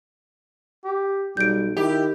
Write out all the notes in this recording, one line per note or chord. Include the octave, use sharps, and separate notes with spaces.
G4
B1 G3 G6 D7
D#3 E4 G4